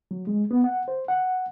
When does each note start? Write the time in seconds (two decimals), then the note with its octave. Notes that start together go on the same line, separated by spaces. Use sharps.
0.11 F#3
0.27 G#3
0.51 B3
0.64 F#5
0.88 C5
1.08 F#5